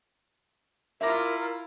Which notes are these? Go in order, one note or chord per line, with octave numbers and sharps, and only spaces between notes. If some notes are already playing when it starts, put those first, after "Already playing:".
E4 F4 A#4 E5 D6 A#6